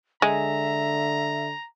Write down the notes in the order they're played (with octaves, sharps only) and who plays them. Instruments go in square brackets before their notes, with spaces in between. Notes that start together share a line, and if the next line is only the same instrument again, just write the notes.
[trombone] D3 [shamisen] G#3 [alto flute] E5 [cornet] A#5